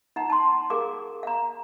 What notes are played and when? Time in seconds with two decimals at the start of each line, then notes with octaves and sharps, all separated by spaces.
0.16 D#4 F#5 A#5
0.30 A5 C6
0.70 G#4 A#4 F5 D6
1.23 F5 A#5